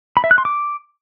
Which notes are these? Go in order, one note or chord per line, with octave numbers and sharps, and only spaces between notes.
B5
E5
F#6
C6
D6